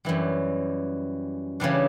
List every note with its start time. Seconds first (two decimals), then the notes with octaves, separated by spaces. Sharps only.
0.05 F#2 E3 G3
1.60 C#3 E3 G3 D4